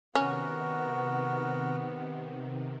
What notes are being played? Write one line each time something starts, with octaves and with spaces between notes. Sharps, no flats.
C3 D#3 B3 C#4 F#4 A#4